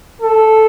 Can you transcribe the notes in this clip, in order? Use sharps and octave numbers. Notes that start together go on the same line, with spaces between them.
A4